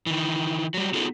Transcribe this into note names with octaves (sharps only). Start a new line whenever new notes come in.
D#3 E3
F#3 G3
B3 D#4 F4 F#4 G#4 A4